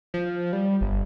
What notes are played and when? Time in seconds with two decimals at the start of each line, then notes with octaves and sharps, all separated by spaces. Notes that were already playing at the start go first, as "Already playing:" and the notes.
0.14 F3
0.53 G3
0.81 G1